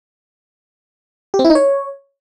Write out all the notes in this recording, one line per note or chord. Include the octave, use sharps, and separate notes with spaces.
G4
C4
E4
D#4
C#5